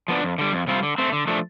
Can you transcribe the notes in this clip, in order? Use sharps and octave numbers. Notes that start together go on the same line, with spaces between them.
F3 B3 D4
F2
D3 G3
F2
C3 G3 C4 F4
D3
A3 C4
D3
F3 A3 D4